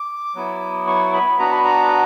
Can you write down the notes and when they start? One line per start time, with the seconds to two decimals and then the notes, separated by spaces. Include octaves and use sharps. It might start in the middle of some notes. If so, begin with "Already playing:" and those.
Already playing: D6
0.35 F#3 B3 E4
0.87 C#6
1.13 B5
1.39 B3 D4 F#4 A#5
1.51 B5
1.64 A#5